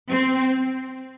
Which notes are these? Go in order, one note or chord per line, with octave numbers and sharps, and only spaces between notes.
C4